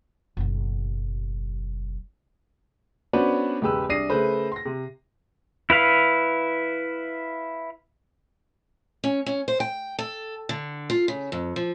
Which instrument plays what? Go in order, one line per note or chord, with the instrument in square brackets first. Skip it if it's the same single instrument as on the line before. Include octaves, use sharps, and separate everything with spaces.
[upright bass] F#1 B1
[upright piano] B3 C#4 D4 F#4 B4 C5
E1 G#2 C#3 G4 B4 E6
C2 D4 D#6 A#6 C7 D#7
C#3 A3 B4 C5
C6 A#6
C3
[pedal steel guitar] E4 B4 F5
[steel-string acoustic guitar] C#4
C#4
C5
G5
A4
D3
F4
C#3
F2
F3